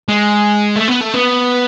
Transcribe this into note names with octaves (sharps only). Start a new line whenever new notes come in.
G#3
A3
B3
A3
B3